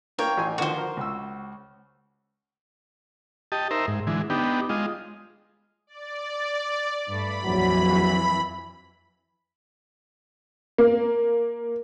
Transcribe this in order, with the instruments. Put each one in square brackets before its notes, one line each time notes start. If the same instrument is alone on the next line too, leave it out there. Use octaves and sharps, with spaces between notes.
[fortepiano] A#3 D4 [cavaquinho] A#4 C#5 G5
[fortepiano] A1 G#5 C6
[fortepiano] D3 D#3 F3 [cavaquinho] F#4 C5
[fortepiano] A#4
C#2 E6
[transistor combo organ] G4 D#5 A5
D#4 A#4 C5 E5
G#2
D3 E3 G#3
B3 D4 D#4 G4
G#3 F4 D#5
[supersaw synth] D5
[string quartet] G2 A3 [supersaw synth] B5
[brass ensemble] A#1 F#3 [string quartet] F2 E3
[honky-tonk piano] A#3